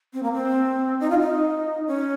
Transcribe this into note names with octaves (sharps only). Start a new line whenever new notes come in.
C4
A#3
C4
D#4
F4
D#4
C#4